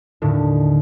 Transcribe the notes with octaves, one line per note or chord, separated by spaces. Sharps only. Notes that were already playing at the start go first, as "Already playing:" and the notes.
D#2 A2 D3